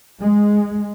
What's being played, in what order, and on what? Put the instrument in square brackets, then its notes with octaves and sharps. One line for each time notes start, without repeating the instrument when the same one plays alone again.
[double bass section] G#3